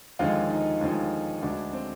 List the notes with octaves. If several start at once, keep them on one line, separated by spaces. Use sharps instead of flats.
D#2 D3 F3 G#3 F4
D#4
D#2 D3 F3 G#3
D2 D3 G#3 D4
C4